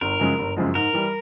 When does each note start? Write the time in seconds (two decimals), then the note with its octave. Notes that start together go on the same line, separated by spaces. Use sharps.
0.01 G1 A#4
0.19 F#2 C#3 F3 G#3
0.39 G1
0.56 F#2 C#3 F3 G#3
0.75 G#2 A#4
0.93 E3 G3